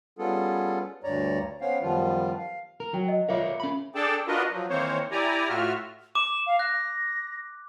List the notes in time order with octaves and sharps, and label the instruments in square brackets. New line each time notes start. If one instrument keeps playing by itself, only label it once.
[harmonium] G3 B3 C#4 F4 G#4 A4
D2 G2 C#5 D5 A#5
B3 C#4 C5 C#5 F5 G5
F#2 D#3 F3 G3 B3 F4
F5
[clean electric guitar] A#4
[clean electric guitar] F#3 [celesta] G5
[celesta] D#5
[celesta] F4 E5 F5 [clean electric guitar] A#4 C#5 D5
[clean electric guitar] C#4 B5
[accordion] D4 G#4 A4 D5 G5 A5
D4 F4 F#4 A#4 B4 D#5
F3 F#3
D#3 E3 A#3 C4 C5 C#5
E4 G4 D5 G#5 A#5
A2 F4 F#4 E5 F6
[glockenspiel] D6 [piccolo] E7
[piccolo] F5
[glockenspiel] F#6 [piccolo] A#6